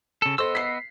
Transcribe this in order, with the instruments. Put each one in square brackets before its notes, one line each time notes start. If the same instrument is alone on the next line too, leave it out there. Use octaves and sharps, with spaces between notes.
[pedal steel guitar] C#3 A4
[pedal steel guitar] B3 D#5 E6 [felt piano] A4 C5 C6
[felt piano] B6 C7